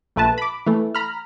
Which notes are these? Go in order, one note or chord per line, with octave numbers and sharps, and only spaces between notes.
A#1 A3 B4 A5
B5 D6
E3 A3
A#5 B5 F6